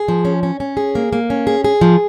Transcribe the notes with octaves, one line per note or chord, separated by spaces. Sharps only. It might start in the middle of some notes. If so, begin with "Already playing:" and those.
Already playing: G#4
F3
C#4
C#4
C#4
G#4
A#3
A#3
C#4
G#4
G#4
F3